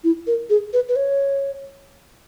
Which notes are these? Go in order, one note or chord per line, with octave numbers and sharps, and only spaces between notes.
E4
A#4
G#4
B4
B4
C#5